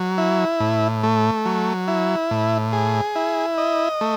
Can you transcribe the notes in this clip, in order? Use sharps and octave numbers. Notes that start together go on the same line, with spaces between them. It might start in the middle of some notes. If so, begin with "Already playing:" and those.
Already playing: F#3
E4
A2
A3
F#3
E4
A2
G#4
E4
D#5
A3